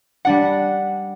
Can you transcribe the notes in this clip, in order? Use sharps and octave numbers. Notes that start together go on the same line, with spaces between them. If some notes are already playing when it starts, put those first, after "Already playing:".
G3 D4 F#5